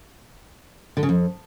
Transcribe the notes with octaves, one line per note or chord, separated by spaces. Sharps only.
D3
C#3
F2